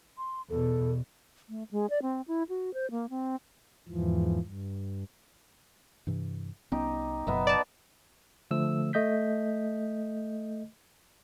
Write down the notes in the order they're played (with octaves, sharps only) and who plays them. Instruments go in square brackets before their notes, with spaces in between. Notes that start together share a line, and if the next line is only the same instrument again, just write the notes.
[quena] C6
[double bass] E2 B2 [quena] A4
[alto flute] A3
G#3
D5
C4
E4
F#4
C5
A#3
C4
[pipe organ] E2 G#2 E3 F3
G2
[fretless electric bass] G2 C3 E3
[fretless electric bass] C2 B3 C#4 [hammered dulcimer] D#4 G4
[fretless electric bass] F#1 F#2 B2 [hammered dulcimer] B3 D#4 E5
[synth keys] D5 A5
[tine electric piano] D3 F3 A3 E6
A3 D#5 G6 B6